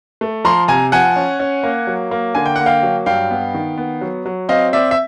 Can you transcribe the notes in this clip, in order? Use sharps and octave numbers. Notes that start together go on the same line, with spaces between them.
A3
F3 A#5 C6
C3 G#5 A#5
F3 F#5 G#5
C#4
C#4
A#3
F#3
A#3
D3 G#5
G5
A#3 F#5
F5 G5
F#3
G2 F5 G5
B3
D#3
B3
F#3
F#3
C4 D#5 F5
C4 D5 E5
E5